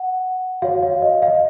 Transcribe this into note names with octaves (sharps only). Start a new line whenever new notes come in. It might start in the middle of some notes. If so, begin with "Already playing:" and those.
Already playing: F#5
F#4 C#5 F5
F5
D#5
F5